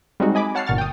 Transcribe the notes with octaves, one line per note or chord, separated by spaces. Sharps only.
G3 G#3 C4 D#4 F#4
D#5 G#5 B5 D6
C#5 F#5 A5 F6 C7
G1 A#2 C#6 F6 A6
G5 D#6